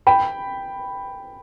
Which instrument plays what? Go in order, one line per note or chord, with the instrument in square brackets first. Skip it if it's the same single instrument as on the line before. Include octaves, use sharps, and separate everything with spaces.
[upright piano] G5 B5